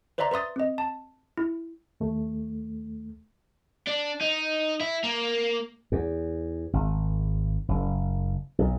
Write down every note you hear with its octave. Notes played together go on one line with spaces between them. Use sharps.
B4 C5 D5 E5 A#5 C6
B4 E5 C6 D#6 A6
C4 D#5
A5
E4
D#2 A3
D4
D#4
E4
A#3
E2
G#1
F#1
B1